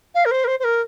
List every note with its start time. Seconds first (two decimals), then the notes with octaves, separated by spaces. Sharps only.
0.14 F5
0.25 A#4
0.31 C5
0.44 A#4
0.47 C5
0.59 C5
0.64 A#4